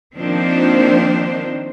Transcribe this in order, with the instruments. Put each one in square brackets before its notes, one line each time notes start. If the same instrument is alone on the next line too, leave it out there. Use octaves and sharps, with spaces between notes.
[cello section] D#3 F3 A#3 C4 D4 C5